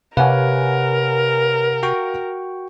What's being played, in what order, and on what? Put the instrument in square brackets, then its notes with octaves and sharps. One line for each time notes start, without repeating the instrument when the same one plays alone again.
[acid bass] C3 [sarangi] A#4 [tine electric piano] B4 C#5 [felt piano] F5 F#5 G#5
[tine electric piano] F#4 G5 C#6